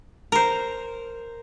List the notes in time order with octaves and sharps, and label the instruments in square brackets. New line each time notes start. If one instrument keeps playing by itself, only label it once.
[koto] A#4 C5